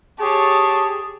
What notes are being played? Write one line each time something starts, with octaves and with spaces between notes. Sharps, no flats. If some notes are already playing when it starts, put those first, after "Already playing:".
G4 G#4 C#5 A5